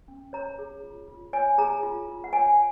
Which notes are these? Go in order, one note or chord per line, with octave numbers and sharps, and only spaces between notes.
C#4
C#5 A#5
G#4
F4
F4
C#5 G#5
G#4 A#5
F4
F4
F#5
C#5 G#5